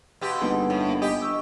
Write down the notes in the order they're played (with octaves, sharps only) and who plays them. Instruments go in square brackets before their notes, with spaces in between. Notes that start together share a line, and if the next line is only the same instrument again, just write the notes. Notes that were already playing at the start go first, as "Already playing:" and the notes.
[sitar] B2 G4 [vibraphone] F5 C6 E6
[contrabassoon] G1 [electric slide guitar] A#3 D#4 G#4 [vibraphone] B4 F#5
[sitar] A2
[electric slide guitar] G2 A#3
[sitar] G4 [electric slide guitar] D#5 [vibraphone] G#5
[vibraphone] D4 C#6 E6